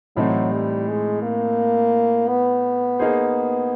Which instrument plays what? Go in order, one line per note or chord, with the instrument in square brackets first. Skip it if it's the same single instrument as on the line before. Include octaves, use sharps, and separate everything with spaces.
[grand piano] A2 E3 A3 C4 D#4 [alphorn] F#3
[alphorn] G3
G#3
A#3
B3
[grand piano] A#3 D#4 G#4 C5